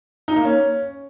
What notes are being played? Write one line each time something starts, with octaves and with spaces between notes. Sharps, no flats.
D#4
A#3
C#4